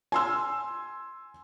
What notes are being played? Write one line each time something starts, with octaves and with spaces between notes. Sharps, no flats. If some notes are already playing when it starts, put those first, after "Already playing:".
G#5 C6 E6